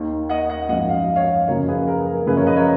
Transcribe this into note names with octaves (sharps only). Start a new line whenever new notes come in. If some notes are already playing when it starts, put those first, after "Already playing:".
Already playing: D#2 D#3
D#5 F#5
D#5 F#5
G#1 F#2 F3 D#5 F#5
F5
D#5
C#5 F5
F#1 F#2 F3 A#4 C#5
G#4 B4
A#4
A#4
F#1 F#2 C#3 F3 G#4 B4
A#4 C#5
B4 D#5
A#4 C#5